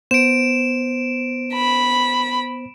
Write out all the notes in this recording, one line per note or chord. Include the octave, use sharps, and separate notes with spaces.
B3 C5 D7 E7
B5